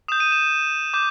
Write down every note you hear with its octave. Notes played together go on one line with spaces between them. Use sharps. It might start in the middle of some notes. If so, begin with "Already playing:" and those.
D#6 G6 E7
D#7
E7
D6 G6